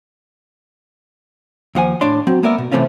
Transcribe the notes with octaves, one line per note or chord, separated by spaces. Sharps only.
D#2 F3 F#5 G#5
A2 D4 C#5 D5 C6
F#3 C4
G#3 A#3 B3 A#4 D5 E5
B2
C3 E3 A3 C4 C#4 F4